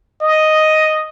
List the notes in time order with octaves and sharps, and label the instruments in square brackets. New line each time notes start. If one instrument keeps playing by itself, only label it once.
[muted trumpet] D#5